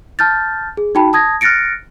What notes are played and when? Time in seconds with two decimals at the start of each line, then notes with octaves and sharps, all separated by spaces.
0.19 A5 F6 G6 A6
0.77 G#4
0.95 D#4 F#4 G5 A5 B5
1.13 A5 D#6 G#6 A#6
1.41 F6 F#6 A6 A#6 C#7 D7